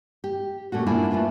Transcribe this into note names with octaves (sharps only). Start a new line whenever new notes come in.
G4
A#2 A3 C#4 F#4
A#3 D4 E4 F4 G#5
A3 D4 F4 B4